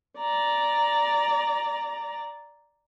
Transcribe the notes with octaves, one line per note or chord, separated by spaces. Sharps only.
D5 A#5